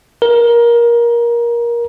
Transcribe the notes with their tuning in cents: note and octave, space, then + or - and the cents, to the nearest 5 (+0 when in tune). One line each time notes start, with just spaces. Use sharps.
A#4 +20